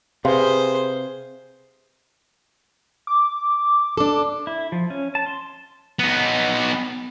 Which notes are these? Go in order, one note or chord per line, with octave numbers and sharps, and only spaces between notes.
C3 G#4 B4 C5 F5 C6
D6
D4 A4
E4
F3
C#4
A5
C6
B3 D#4